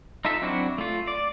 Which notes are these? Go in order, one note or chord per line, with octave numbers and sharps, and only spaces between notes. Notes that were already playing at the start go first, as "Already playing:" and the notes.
D#4 F4 A4 E5
F#3 C4 D4 E4 F#4
A3 F4
D5